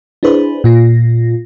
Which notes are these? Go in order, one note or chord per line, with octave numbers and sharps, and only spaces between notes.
D4 E4 G#4 B4 C5
A#2 F4 A#6